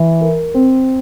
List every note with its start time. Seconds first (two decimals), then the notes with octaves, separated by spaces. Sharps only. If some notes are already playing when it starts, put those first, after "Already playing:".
Already playing: E3
0.21 A#4
0.54 C4